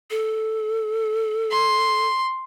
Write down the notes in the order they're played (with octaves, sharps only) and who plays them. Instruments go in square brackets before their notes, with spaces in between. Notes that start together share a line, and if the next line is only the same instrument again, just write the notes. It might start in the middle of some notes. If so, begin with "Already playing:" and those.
[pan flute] A4
[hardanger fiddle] C6